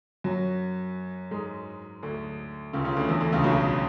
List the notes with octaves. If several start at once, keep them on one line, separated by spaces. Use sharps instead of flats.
F#2 F#3
G#2 G#3
D2 D3
C#2 C#3
C#2 C#3
D2 D3
E2 E3
D2 D3
C#2 C#3
B1 B2